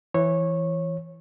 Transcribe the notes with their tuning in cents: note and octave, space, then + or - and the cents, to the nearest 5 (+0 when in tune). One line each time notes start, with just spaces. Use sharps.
E3 +10 C#5 -20